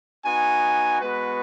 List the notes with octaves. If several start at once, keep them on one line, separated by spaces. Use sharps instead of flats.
B3 D#4 F#4 G#5
G#3 B3 F#4 B4